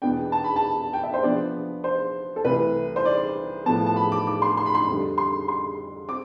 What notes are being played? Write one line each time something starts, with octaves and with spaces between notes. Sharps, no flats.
E2 B2 B3 D4 G5
A5
B5
A5
G5
E5
C5
C3 F3 B3 D4 D5
C5
A4
C2 C3 E3 A3 B4
C5
D5
A2 F3 B3 A5
A5
B5
D6
D6
C6
C6
B5
C6
F2 D3 G3
C6
C6
C4 D6